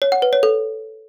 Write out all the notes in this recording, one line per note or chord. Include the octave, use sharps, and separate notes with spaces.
C#5
F#5
B4
C#5
A4